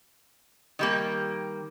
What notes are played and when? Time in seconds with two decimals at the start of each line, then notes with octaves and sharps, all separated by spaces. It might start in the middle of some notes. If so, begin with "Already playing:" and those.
0.79 D#3 G3 A#3